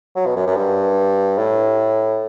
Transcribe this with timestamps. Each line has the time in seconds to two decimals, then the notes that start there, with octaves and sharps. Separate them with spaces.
0.16 F#3
0.26 B2
0.36 F#2
0.47 F#2
0.56 G2
1.38 A2